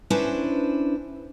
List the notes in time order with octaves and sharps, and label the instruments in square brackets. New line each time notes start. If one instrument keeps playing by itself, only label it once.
[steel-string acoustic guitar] C#4 D4 E4 B4 C5